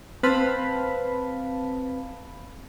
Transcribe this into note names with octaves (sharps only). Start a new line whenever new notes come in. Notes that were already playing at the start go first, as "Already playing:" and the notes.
C4 B4 F5 A5 B5